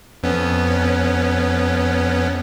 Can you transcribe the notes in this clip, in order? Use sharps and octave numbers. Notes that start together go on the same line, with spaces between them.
F2 B3 C#4